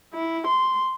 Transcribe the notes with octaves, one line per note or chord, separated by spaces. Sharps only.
E4
C6